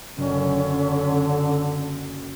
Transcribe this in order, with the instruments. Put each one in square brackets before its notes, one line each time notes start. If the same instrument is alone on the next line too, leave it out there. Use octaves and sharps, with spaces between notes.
[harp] F#1 [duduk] D3 [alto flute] C#4